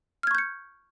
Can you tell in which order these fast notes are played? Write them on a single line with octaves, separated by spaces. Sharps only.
F6 G#6 C#6 G6 C#7